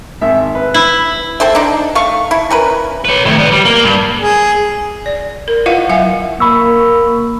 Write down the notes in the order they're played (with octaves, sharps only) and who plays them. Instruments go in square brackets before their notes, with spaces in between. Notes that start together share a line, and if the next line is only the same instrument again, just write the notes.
[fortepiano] G#1 E5
B4
[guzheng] E4
[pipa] C4 A4 C5 E5
D4 D#4
A3 F5 C#6
E4
C#4 A#4 B4
[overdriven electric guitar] B4 C#5
A2 D#3
B4 D5
G3
A#3
G2
[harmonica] G#4
[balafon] D5
A#4
E4 F4 B4 D#5 F5 F#5
F#3 E5 F5 G#5
[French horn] A#3 [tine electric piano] B5 C#6 E6